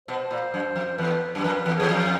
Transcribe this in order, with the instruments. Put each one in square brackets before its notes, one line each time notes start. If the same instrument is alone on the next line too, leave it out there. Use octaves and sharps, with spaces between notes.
[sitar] B2 [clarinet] C5
[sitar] A#2
F#2
F2
[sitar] E2 [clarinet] B4
[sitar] F#2
[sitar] F2 [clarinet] B4
[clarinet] B4
[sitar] E2 [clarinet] B4
[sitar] E2 [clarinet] G#4
[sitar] F2